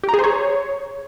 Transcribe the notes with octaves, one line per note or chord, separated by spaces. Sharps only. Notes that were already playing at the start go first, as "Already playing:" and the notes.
G4
A#5
G#4
C5
C#5